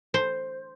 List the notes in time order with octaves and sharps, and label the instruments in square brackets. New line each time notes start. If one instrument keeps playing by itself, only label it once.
[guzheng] C5